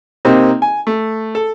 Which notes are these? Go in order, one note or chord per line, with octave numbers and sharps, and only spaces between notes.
C3 A#3 C4 D#4
G#5
A3
A4